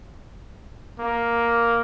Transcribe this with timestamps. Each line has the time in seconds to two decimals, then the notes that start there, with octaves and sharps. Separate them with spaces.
0.99 A#3